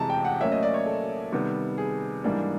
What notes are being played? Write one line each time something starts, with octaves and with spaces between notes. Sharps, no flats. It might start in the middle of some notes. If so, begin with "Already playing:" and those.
Already playing: F2 C3 E3 G#3 A5 A#5
G5
F#5
A2 F#3 A#3 C#4 E5
D#5
D5
C#5
A4
C3 D#3 G3 B3
G#4
G#2 E3 G3 A#3 D4